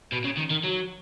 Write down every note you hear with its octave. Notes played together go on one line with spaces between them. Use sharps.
B2
C#3
D#3
D#3
F#3